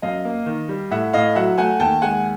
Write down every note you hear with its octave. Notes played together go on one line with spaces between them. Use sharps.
F#2 D#5 F5
A#3
D#3
G3
A2 E5 F#5
A2 D#5 F5
F#3 E5 F#5
A3 F#5 G#5
D#2 G5 A5
G#3 F#5 G#5